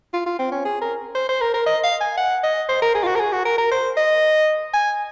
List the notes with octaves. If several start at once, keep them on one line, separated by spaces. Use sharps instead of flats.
F4
F4
C4
C#4
G#4
A#4
C5
C5
A#4
A#4
D#5
F5
G#5
F#5
D#5
C5
A#4
G#4
F4
F#4
A#4
G#4
F#4
A#4
A#4
C5
D#5
G#5